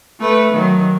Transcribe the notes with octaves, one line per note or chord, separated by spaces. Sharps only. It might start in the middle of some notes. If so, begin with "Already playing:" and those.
A3 B4
D#3 F#3